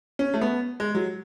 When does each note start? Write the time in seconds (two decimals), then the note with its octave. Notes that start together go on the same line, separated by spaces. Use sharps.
0.19 C#4
0.34 A3
0.41 B3
0.80 G#3
0.95 F#3